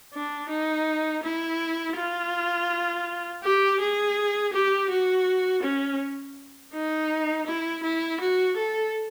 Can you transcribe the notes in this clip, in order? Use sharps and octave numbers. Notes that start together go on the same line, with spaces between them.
D4
D#4
E4
F4
G4
G#4
G4
F#4
C#4
D#4
E4
E4
F#4
A4